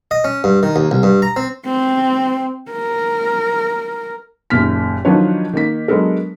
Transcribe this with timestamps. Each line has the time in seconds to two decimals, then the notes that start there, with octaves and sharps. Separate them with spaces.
0.11 D#5
0.24 C#4
0.44 G2
0.63 D#3
0.76 D#2
0.91 C2
1.03 G2
1.22 A#5
1.36 C4
1.65 C4
2.71 A#4
4.50 F#1 D#2 A#2 F6 B6
5.05 D#3 F3 F#3 D4 B4 C#5
5.53 D#3 A#3 B6
5.88 F#3 G#3 B3 D4 A4 A#4